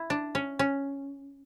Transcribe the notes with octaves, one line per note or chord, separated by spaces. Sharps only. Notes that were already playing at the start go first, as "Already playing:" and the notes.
Already playing: E4
D4
C#4
C#4